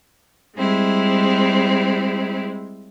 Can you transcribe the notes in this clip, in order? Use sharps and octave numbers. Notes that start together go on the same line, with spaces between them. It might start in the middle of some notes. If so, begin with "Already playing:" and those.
G3 G#3 C4 E4